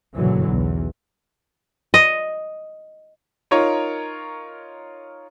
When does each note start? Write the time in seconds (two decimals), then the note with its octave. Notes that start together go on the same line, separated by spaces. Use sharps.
0.15 F#1 G2 B2 D3 E3 F#3
0.49 B1 E2
1.94 D#5
3.51 D#4 F4 A#4 C#5